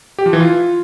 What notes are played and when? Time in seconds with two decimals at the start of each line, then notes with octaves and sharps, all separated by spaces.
0.18 G4
0.26 F3
0.33 E3
0.40 F4